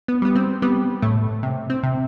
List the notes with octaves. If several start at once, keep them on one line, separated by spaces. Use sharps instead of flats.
B3
G3 B3
C4
G3 B3
A2 A3
C3
C4
C3